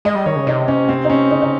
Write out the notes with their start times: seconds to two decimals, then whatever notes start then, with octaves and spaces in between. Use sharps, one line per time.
0.05 G#3 D#5
0.15 G3
0.26 D#3 C#5
0.36 C#3
0.47 C3 D#4
0.68 C#4
0.89 C4
1.05 D#4
1.10 C#4
1.31 C#3 D#4
1.42 D#4